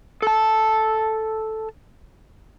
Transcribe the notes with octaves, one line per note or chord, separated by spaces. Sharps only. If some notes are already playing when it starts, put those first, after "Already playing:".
A4 A5